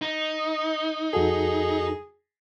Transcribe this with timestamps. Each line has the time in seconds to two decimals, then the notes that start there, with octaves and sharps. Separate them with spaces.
0.02 D#4
1.13 F2 F#4 G#4 A4